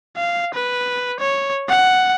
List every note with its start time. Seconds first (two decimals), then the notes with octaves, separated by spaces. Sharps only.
0.17 F5
0.54 B4
1.20 C#5
1.69 F#5